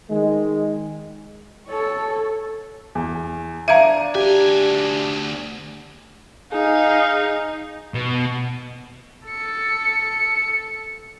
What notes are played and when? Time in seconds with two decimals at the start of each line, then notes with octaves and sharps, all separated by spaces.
0.11 D#3 G#3
1.67 A4 C#5
2.95 E2
3.68 D4 E5 F5 A#5 G#6 D#7
4.15 D2 G4 G#5
6.53 D#4 G#4 F5
7.94 B2
9.28 A4 C#7